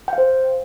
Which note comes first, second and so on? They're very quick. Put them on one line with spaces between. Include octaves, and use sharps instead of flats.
G5 F5 C5